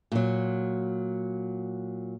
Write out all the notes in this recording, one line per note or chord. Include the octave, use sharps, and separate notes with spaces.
A#2 F#3